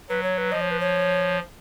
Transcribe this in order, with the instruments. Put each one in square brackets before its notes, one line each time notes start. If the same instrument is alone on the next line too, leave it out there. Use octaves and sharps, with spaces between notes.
[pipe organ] F#3 [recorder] B4
[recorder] C#5
B4
[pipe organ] F3 [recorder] D#5
[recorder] C#5
B4
C#5